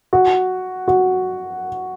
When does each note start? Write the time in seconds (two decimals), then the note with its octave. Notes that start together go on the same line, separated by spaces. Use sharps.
0.13 F#4
0.88 F#4